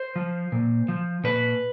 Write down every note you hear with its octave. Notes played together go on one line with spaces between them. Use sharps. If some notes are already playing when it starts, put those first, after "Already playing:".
Already playing: C5
F3
A#2
F3
A#2 B4